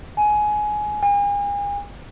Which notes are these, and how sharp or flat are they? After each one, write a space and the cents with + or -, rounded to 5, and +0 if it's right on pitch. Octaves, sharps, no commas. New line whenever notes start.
G#5 +15
G#5 -40